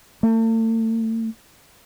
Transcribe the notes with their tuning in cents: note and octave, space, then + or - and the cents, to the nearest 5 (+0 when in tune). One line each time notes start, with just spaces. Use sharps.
A3 +40